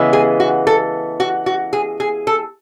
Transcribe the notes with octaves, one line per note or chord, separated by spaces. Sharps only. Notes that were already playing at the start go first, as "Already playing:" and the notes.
Already playing: C#3 E3 G#3 B3
G#4
F#4
A4
F#4
F#4
G#4
G#4
A4